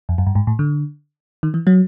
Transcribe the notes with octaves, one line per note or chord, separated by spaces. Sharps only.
F2
F#2
G2
G#2
A2
D3
D#3
E3
F#3